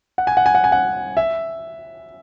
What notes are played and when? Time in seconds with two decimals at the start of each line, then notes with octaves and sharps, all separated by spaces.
0.18 F#5
0.27 G#5
0.37 F#5
0.46 G#5
0.55 F#5
0.64 G#5
0.72 F#5
1.17 E5